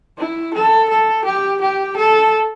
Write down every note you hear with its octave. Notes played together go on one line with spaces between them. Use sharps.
E4
A4
A4
G4
G4
A4